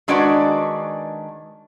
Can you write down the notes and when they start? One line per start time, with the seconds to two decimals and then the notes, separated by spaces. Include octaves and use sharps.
0.08 D#3 G#3 D4 F#4 B4 D5